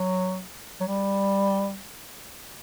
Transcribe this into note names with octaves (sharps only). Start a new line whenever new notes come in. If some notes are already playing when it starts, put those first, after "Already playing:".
Already playing: F#3
F#3
G3